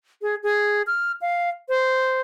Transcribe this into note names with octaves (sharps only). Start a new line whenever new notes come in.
G#4
G#4
F6
F5
C5